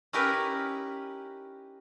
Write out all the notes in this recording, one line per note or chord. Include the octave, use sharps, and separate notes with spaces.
C#4 D#4 E4 G4 A#4 B4